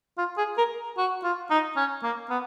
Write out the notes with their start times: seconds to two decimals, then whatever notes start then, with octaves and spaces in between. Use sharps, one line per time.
0.18 F4
0.37 G#4
0.58 A#4
0.98 F#4
1.24 F4
1.50 D#4
1.77 C#4
2.03 A#3
2.30 B3